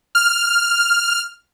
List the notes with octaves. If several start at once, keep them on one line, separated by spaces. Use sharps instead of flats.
F6